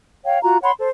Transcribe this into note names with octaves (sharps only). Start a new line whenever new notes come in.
C#5 F5 G5
F4 F#4 A#5
C#5 F#5 B5 C6
A4 C5